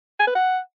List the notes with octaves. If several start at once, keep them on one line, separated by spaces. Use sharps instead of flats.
G#5
B4
F#5